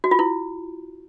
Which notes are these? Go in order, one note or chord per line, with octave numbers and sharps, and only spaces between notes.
F#4
F4
E4